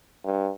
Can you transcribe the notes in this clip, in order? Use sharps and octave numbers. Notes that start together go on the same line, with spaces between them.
G2